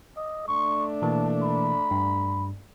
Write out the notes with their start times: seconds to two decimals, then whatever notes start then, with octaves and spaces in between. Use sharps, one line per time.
0.16 D#5
0.48 A3 D4 C#6
1.02 B2 E3 A#3 A5
1.43 B5
1.91 G2